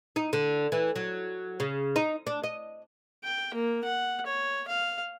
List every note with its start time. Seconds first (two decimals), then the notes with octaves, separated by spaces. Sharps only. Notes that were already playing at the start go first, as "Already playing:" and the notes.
0.16 D#4
0.33 D3
0.72 E3
0.96 F#3
1.60 C#3
1.96 D#4
2.27 D4
2.44 D#5
3.24 G5
3.54 A#3
3.84 F#5
4.26 C#5
4.68 F5